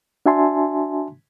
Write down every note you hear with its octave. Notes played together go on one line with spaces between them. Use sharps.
D4 F#4 E5 G#5 A5 C6